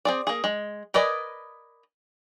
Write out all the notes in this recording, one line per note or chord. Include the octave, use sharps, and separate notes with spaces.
C4 G#4 D5
A#3 G#4
G#3
A#4 B4 D5 D#5 G#5